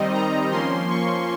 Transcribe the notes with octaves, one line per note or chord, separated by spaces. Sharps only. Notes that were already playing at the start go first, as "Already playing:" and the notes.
Already playing: D#3 G3 C4 D#4 D#5
A#5
F3 A#3 C#4 C6
C#6